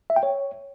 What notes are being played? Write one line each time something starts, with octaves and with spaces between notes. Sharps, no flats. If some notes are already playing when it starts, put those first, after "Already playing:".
E5
G5
C#5